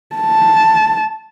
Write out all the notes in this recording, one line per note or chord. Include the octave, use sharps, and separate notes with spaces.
A5